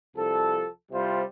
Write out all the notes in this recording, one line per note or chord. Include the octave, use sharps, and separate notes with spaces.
C2 F3 A4
C2 C3 G3 F4 C5